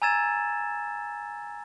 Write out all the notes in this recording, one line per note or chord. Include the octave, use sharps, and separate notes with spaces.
G#5 A#5 E6 G#6 A6 E7